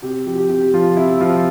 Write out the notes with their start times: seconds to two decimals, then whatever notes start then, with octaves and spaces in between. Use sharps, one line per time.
0.02 C3 G4
0.26 F3 G4
0.38 G4
0.50 C3 G4
0.74 F3 F4
0.97 C3 E4
1.20 F3 F4